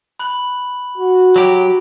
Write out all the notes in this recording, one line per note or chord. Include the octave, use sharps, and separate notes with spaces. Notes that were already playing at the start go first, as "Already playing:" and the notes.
B5 F#6 F#7
F#4
F#3 G4